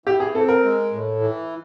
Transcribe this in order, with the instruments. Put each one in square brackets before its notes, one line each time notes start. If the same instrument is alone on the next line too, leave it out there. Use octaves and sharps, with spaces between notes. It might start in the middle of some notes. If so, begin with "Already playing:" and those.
[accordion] E3 [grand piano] G4
[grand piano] G#4
[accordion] C4 [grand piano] A4
[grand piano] A#4
[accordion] G#3
A2
E3